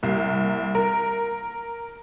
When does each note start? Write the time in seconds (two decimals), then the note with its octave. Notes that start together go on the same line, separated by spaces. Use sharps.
0.03 C2 A#3
0.75 A#4